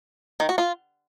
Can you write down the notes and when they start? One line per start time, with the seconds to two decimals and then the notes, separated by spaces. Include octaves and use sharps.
0.40 D#3
0.49 F#4
0.58 F4